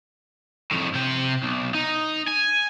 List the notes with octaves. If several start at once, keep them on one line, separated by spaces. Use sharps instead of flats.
F2 A2
C3 G5
B1
D#4
G#5